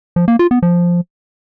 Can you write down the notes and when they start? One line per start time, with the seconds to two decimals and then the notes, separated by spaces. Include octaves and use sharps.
0.16 F3
0.28 A#3
0.39 F4
0.51 B3
0.62 F3